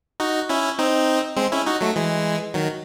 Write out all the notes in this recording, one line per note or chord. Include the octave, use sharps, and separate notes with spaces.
D#4 F#4
C#4 E4
C4 D#4
G#3 C4
C#4 E4
D#4 F#4
F#3 A3
E3 G#3
D#3 F#3